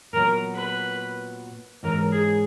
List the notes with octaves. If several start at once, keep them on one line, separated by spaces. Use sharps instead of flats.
A#2 F#3 B3 A#4
B4
G#2 E3 G#3 C#4 A#4
G#4